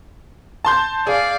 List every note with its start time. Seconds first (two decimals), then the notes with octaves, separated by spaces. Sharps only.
0.65 A5 C6 G6
1.07 G#4 D5 F5